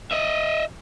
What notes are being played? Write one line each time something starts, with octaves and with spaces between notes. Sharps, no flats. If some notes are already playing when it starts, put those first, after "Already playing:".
D#5 E5